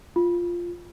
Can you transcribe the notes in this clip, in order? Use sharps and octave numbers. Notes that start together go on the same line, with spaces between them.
F4